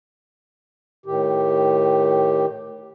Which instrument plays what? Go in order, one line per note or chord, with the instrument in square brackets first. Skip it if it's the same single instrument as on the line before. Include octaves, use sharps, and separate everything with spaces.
[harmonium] A2 D#3 G4